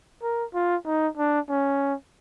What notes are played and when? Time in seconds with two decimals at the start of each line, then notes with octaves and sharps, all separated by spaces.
0.22 A#4
0.54 F4
0.86 D#4
1.17 D4
1.49 C#4